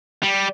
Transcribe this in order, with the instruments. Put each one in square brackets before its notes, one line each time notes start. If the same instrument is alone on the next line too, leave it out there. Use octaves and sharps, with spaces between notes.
[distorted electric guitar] G3